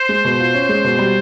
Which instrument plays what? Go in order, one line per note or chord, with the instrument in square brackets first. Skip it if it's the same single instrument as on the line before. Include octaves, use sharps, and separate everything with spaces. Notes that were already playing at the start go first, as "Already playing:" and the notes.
Already playing: [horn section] C5
[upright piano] G#3
B2
F4
C#4
G#3
B2
G3